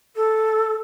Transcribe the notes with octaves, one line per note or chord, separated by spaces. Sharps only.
A4